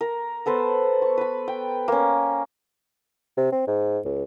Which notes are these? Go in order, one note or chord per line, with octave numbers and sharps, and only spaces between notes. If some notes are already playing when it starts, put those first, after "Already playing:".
A#4
B3 A4 B4 C5
C#6
B4 B5
G5
A#3 C#4
C3
C4
G#2
C#2